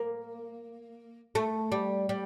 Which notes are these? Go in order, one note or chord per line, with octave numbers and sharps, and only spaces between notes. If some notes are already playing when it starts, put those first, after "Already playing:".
Already playing: A#3
A3
G3
G3